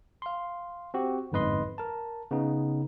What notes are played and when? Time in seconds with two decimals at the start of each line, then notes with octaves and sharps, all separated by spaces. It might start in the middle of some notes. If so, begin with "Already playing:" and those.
0.22 F5 C6
0.94 C4 F#4 G4
1.32 G1 F2 G#2 B4 D#5 C6
1.78 A#4 A5
2.31 C#3 B3 D#4